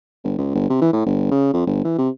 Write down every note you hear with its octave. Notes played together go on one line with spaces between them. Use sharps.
G1
C#2
G1
C3
E3
A2
G1
C#3
F2
G1
E3
C3